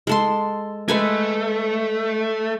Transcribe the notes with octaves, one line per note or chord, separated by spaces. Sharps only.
G#3 A4 C6
G#3 A3 B4 G#5